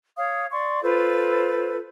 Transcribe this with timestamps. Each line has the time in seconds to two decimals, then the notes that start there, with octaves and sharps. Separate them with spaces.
0.17 C#5 F5 D#6
0.52 D5 C6 C#6
0.82 F4 A4 B4 C5